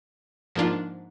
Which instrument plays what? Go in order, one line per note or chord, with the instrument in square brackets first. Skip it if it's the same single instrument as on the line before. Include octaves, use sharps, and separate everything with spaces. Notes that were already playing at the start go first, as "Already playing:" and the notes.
[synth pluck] G#2 F3 A#3 D4 F4